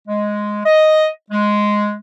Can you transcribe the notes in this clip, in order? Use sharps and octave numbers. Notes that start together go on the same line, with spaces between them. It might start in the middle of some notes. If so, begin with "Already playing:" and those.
G#3
D#5
G#3